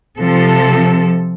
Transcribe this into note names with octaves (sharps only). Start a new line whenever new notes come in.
C3 F3 A4